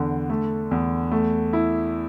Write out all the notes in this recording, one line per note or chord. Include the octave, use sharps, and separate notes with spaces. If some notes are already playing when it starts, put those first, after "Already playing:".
Already playing: E2 D3
A3
E2
A3
E4